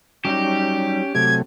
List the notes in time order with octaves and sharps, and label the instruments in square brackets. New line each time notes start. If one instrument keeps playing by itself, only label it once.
[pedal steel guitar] F#3 G3 D#4 [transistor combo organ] C#4 [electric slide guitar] G4
[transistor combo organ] C3 F#3 A3 [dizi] G#6